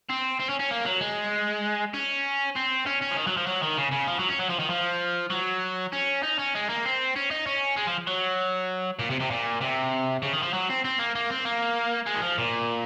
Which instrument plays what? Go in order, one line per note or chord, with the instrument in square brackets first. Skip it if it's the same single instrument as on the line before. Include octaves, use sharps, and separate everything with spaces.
[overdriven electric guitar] C4
C4
C#4
C#4
A#3
F#3
G#3
C#4
C4
C#4
C#4
F3
D#3
F#3
F3
F#3
D#3
C#3
C#3
F3
F#3
C#4
F#3
F3
D#3
F3
F#3
C#4
D#4
C#4
G#3
A#3
C4
C#4
D#4
C#4
G#3
F3
F#3
A#2
C3
C3
A#2
C3
C#3
D#3
F3
F#3
C4
C4
A#3
A#3
C4
A#3
G#3
D#3
F3
A#2